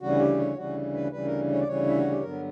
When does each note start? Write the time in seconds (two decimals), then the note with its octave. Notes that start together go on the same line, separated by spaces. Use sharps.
0.01 D2 C#3 E3 G3 F#4
0.19 G4
0.38 C#5
0.56 D2 C#3 E3 G3 F#4
0.93 B4
1.12 D2 C#3 E3 G3 B4
1.25 A#4
1.53 C#5
1.60 D5
1.67 D2 C#3 E3 G3 C#5
1.86 E4
1.98 F#4
2.10 G4
2.22 G2 D3 F#3 B3 A#4